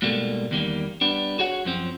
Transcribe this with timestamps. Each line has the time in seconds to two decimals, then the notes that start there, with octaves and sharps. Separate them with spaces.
0.02 G#2 B2 G3 A3 A#3
0.51 E2 D#3 G3 A#3
1.01 G3 B3 D4
1.39 F#4 G#4 C#5 F#5
1.65 F#2 F3 C4